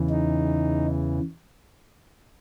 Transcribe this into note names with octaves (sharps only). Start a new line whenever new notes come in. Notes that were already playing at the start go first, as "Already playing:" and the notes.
Already playing: E2 C#3 E3
D#4